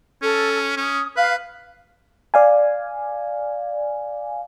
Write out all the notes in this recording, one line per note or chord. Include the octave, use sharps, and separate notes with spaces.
C#4 A4
C#4 D#6
B4 F5 F6
D5 F5 G#5